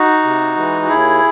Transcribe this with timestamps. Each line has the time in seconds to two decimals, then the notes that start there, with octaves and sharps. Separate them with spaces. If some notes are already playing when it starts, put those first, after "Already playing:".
Already playing: D#4 F#4
0.23 C3
0.56 E3 G#3
0.82 F#4
0.88 D#2 E4 G#4